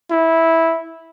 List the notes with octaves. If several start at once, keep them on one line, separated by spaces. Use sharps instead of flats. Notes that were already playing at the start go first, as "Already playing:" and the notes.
E4